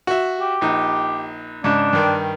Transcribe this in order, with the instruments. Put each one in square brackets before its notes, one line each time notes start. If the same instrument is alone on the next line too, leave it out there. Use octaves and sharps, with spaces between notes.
[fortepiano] F#4 E5
[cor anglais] G4
[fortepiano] A#1 D#4
[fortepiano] G#2 C#3 [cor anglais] D4
[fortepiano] G2 D#3 G5